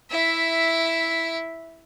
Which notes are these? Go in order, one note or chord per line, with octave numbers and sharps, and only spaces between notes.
E4 E5